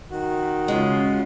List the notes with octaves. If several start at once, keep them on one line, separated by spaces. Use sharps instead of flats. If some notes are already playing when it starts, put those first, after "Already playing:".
D#3 F#4
C#3 G#3 C#4 F4